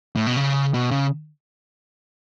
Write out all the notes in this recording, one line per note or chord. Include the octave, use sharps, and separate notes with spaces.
A2
B2
C#3
B2
C#3